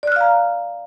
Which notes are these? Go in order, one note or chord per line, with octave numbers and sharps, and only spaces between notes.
D5 F5 A#5 F6 F#6